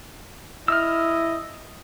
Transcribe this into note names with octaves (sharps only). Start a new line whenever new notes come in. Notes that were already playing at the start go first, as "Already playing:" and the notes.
E4 D#5 E6 F6